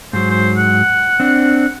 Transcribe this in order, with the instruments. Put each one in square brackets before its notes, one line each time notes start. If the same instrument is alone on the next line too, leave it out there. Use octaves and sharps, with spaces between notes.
[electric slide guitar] G#2 F#3 [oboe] C5
[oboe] C5
F#5
[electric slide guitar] C4 D4